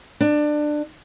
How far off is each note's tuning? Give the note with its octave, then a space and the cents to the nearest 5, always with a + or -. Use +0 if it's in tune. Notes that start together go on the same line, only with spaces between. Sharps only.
D4 +20